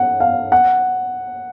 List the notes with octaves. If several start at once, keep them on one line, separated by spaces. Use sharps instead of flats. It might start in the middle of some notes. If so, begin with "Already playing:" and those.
Already playing: F#5
F5
F#5